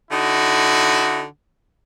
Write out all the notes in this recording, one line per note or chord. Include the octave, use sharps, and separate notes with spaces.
D3 D#4 E4 F#4